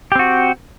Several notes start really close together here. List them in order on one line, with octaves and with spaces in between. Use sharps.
G4 C4 F#4